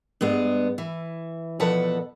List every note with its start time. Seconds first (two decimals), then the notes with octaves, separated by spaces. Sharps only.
0.21 G2 G#3 B3
0.78 E3
1.60 E2 B2 F3 A4 B4 F#5